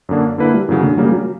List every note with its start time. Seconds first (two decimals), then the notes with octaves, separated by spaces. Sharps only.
0.09 F#2 D3 A#3 D4
0.38 D3 A#3 E4 B4
0.54 G3
0.68 F#2 C#3 E3 F#3
0.83 D3
0.97 C#3 F#3 G3 A#3
1.12 F#3